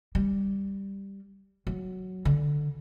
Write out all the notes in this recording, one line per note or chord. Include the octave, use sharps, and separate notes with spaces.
G3
F#3
D3